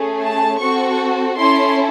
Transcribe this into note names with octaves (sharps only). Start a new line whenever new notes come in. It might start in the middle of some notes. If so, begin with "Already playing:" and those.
Already playing: A3 C#4 G#4
A5
C4 F#4 A4 C#6
C#4 E4 A4 C6